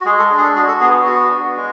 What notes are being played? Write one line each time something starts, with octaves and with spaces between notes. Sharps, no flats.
F#4
G#3 G#4
A4
D4
G#4
A4
F#4 G#4
A4
B3 G#4
F#4
F#4
D4
G#3